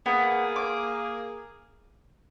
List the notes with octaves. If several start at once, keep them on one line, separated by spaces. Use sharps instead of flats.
A#3 B3 G#4
D6